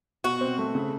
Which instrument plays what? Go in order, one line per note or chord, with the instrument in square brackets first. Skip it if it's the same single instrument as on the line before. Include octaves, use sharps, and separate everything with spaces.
[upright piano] B2 [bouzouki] F#4
[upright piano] C4
A3
C#3